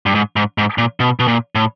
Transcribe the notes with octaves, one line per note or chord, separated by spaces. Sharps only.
G2
G#2
G#2
G#2
A#2
B2
B2
A#2
A2